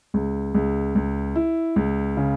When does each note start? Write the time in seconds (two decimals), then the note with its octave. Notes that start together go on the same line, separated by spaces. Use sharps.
0.14 C#2
0.54 C#2
0.95 C#2
1.36 E4
1.76 C#2
2.17 C#3